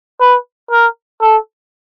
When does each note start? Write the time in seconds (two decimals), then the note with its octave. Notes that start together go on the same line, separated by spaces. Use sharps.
0.21 B4
0.71 A#4
1.22 A4